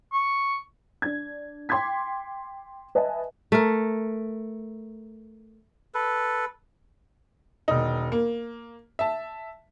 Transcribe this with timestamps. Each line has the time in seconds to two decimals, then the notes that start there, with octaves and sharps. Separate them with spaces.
0.13 C#6
1.02 D4 G#6
1.69 G5 C6 D6 G#6 B6
2.95 B4 D#5 E5 G#5 A5
3.52 A3 A#4
5.94 A4 B4
7.68 E1 D#3 D#4
8.12 A#3
8.99 E5 A5